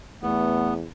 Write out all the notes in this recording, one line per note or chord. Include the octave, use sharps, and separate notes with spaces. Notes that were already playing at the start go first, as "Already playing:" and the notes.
E2 A3 B3